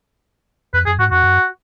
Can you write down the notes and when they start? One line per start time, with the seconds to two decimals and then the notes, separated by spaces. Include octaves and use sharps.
0.73 F2 B4
0.86 F#2 G#4
0.99 G#2 F#4
1.11 F2 F#4
1.23 F#2